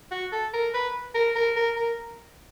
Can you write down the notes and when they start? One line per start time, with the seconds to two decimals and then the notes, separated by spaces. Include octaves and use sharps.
0.11 F#4
0.32 A4
0.54 A#4
0.74 B4
1.15 A#4
1.36 A#4
1.56 A#4
1.77 A#4